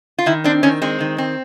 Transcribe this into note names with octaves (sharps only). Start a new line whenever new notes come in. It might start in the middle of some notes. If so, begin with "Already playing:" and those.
F4
D#3 E4
C4 D4
D#3 C#4
G#3 C4
D#3
C4